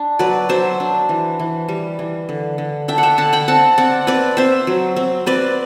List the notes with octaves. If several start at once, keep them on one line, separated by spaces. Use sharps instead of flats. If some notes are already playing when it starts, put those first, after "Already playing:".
Already playing: D4
F#3 B4 D5
F#3 C5 E5
D4
E3
E3
G3
E3
D3
D3
D4 E5 G5
F#5
E5 G5
D3 F#5 A5
G5 B5
C4 F#5 A5
C4 D5 F#5
C4 B4 D5
C4 C5 E5
F#3
C4
C4 B4 D5